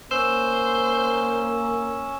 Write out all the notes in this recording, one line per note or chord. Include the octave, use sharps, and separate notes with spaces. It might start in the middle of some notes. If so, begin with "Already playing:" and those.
A#3 C#4 C5 E6 E7